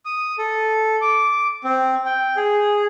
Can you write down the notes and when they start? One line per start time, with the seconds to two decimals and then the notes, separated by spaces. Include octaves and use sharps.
0.05 D#6
0.38 A4
1.01 D6
1.64 C4
2.05 G5
2.36 G#4